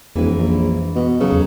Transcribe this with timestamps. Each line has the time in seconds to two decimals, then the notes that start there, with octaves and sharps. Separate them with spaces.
0.16 D#1 F2 E3 G#3
0.38 A#1
0.95 B2
1.20 C#3 F#3 A4
1.32 E2